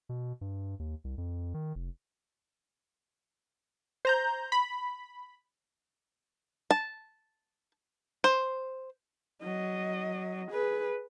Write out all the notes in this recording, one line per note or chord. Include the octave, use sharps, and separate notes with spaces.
B2
G2
D#2
C2
F2
D#3
F1
C5 A#5 G6
B5
A5
C5
F#3 D#5
G#4 B4